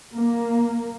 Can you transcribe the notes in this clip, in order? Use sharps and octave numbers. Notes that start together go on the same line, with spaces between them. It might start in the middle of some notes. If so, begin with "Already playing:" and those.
A#3